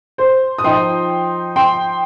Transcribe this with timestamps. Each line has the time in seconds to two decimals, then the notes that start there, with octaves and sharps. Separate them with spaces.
0.18 C5
0.58 D#6
0.64 F3 D#4 G5 C6
1.56 G5 C6